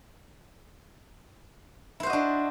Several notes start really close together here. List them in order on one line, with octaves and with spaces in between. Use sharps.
E4 C5 F#4 D#5 D4